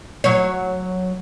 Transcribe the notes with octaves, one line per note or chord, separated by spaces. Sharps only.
F#3 C#5